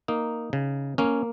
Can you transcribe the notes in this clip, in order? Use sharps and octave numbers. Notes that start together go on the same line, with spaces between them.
A#3 D#4
C#3
A#3 C#4